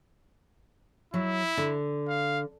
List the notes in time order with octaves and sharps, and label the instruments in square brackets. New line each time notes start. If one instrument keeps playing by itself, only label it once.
[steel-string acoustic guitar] F#3 [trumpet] E4
[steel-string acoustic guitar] D3
[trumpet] F5